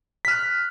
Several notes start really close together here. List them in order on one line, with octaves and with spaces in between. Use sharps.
B6 F6 F#6